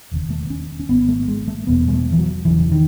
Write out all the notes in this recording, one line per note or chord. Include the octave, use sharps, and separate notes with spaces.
E1 D#2 C#3
A3
C#4
C#4
G#1 G#2 B3
A3
G#3
A3
E1 E2 B2 B3
G#3
A3
E3
F#3
E1 E2 C#3 E3
D#3